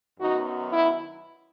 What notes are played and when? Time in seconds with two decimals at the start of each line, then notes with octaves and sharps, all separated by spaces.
0.20 F#2 D#3 F#3 B3 D#4 F#4
0.73 E4